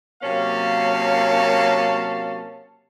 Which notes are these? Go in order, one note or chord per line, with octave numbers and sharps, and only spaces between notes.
C3 F#3 A#3 C#4 F5 A5